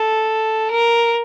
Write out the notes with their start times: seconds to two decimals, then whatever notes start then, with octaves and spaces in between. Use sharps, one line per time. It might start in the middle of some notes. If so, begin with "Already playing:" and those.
Already playing: A4
0.71 A#4